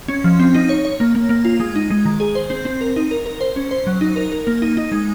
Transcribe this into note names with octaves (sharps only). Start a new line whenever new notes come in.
C#4
F3
C4
D#4
C#5
C#5
A#3
A#3
A#3
F4
G#3
D#4
G#3
D#3
G#4
C5
C4
C4
A#4
D#4
A#4
A#4
C5
C#4
C5
F#3
D#4
A#4
A#4
A#3
D#4
D#4
G#3